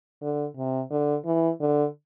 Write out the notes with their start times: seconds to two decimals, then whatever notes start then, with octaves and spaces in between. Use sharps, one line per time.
0.22 D3
0.57 C3
0.91 D3
1.25 E3
1.61 D3